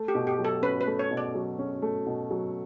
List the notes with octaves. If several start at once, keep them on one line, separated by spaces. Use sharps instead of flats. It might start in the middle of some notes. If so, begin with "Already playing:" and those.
Already playing: A3
G4
B2
G4
F#3
A4
C#4 B4
B4
A3
C#5
B2
D5
F#3
C#4
A3
B2
F#3